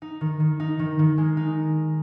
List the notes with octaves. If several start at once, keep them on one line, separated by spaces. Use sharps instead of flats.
D#4
D#3
D#3
D#4
D#3
D#3
G#3
D#4